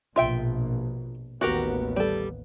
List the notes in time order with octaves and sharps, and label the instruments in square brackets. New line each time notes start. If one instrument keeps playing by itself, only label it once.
[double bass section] A#1 B2 [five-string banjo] F4 E5 G5
[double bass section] A1 D#2 B3 [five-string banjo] F#4 G4 A#4
[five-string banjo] G3 A4